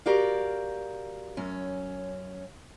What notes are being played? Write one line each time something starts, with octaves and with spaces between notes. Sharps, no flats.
F#4 G4 A#4 D5 F5
F#2 C#4